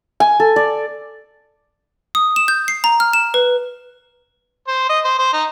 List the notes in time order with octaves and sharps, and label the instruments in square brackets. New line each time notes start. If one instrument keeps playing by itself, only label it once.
[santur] G#5
A4
D5
[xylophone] D#6
E7
G6
C7
A#5
F6
E7
B4
[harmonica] C5
D#5
C5
C5
D#4